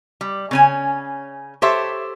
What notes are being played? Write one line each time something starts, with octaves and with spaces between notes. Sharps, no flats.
G3
C#3 C#4 G#5
G4 A4 C5 C#5 E5